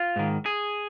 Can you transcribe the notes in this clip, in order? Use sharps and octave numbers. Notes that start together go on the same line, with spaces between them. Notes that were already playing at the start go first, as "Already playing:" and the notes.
Already playing: F4
G#2 D#3
G#4